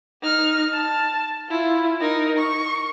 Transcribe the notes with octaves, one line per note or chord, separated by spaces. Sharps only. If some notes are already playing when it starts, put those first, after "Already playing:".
D#4 F6
A5
E4 F4
D#4 A#4
C#6